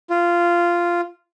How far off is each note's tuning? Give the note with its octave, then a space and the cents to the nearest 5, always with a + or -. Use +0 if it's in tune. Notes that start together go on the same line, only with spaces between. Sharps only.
F4 -10